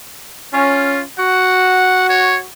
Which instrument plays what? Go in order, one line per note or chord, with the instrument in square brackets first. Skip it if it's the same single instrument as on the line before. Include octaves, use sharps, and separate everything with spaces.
[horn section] C#4 [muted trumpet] F4
[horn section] F#4 [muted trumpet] F#5
[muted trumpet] C#5